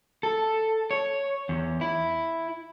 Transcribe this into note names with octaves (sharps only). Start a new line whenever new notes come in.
A4
C#5
E2
E4